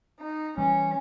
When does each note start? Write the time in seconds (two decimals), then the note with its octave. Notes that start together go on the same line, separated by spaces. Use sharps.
0.20 D#4
0.58 E3 G3 C#4